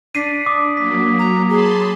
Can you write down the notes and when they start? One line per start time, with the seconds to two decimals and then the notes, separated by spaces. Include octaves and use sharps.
0.15 D4 B6 C7 D#7
0.46 D6 D#6
0.77 F#3 A#3 B6
1.19 F#3 A#5
1.50 G#4 A5 B5 C6